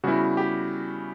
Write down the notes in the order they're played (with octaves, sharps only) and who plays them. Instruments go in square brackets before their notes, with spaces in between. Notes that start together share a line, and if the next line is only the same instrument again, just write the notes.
[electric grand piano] C#3 G3 B3 E4 F#4
G4